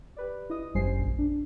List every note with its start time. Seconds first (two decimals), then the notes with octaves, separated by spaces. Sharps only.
0.17 G4 B4 D5
0.50 E4 D#5 D#6
0.74 G1 F#2 G3 C5 G#5 C7
0.98 A#1
1.19 D4